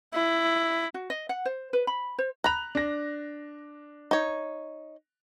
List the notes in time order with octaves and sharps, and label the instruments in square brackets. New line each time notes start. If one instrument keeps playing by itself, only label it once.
[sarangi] E4
[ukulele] F#4
D#5
F#5
C5
B4
B5
C5
[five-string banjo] A#5 B5 [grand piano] F#6 F7
[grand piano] D4 A#6
[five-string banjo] D#4 C#5